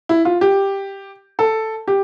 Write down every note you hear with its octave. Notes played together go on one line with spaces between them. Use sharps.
E4
F4
G4
A4
G4